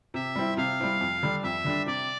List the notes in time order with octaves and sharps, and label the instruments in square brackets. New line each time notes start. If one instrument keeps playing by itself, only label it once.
[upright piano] C3 [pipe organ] E5
[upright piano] G3 C4 E4
[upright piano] C3 [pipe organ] F5
[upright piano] G3 C4 E4
F2
D3 G3 D4
[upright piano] F2 [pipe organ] E5
[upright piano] D3 G3 D4
[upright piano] C3 [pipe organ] D5